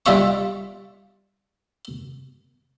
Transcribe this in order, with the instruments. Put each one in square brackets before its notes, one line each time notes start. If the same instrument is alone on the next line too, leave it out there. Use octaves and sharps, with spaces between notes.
[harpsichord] G3 F4 E5 C#6